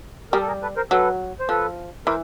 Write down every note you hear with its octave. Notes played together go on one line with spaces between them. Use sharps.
G3 G#4 A#4
A4
G#4 A#4
A4 B4
A#4 C5
F#3 A4 B4
C5
F3 A4 B4
E3 A#4 C5